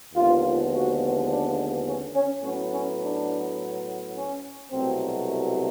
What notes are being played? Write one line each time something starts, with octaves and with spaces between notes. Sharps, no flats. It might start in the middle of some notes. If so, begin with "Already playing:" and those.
D#2 D3 F3 G#3 B3 F4
F#4
D4
C#4
C#4
A2 F#3 B3 C#4
C#4
D4
C#4
C2 B2 F#3 A3 C4